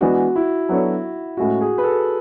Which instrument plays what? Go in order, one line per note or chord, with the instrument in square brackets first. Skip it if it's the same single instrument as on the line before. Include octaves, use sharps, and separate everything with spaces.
[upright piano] E3 G#3 B3 D4 [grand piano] F#4
[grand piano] E4
[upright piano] F#3 B3 D4 A4 C#5
[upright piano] A2 G#3 C#4 E4 [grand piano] F#4
[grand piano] G#4
B4
A4